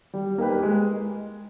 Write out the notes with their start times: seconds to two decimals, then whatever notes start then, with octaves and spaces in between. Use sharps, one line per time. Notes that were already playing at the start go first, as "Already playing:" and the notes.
0.14 G3
0.38 A#3 D#4 G4 B4
0.63 G#3